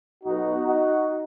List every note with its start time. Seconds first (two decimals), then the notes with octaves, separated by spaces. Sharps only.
0.24 B1 B2 D#4 F#4
0.66 D#4 F#4